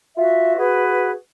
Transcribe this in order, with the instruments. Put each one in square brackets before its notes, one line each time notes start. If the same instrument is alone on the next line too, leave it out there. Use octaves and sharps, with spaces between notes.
[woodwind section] F4 F#4 E5
F#4 G#4 B4